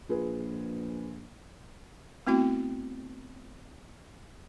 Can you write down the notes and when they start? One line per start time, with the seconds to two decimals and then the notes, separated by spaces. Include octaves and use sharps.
0.09 A#1 F4 G#4 B4
2.27 A3 B3 C4 E4 F#4 G5